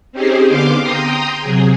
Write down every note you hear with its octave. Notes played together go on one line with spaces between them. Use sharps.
C4 C#4 D#4 G4 G#4 C5
D3 B3 F5 C6 D6
G5 A#5 C6 D#6
C3 F#3 G#4